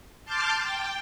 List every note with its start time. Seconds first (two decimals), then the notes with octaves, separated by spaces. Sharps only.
0.25 A5 C6 D6 F6 G6 A6
0.61 G5